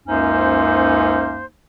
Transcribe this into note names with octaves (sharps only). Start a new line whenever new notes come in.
C#2 F#2 A#3 C#4 D#4 C5